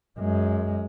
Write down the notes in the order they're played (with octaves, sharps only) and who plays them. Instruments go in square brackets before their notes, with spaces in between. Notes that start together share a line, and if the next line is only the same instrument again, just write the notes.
[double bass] F#2 G#3